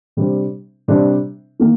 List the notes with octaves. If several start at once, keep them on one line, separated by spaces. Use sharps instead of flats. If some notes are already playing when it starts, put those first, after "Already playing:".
C3 G3 D4 G4 C5
C3 G3 D4 G4 C5
D#3 A#3